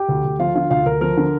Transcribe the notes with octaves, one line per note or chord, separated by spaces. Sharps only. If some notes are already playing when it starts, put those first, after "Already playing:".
Already playing: G4 G5
D2
D2
F3 F4 F5
D3 F4 F5
D2 F4 F5
D2 A#4
F3 A#4
D3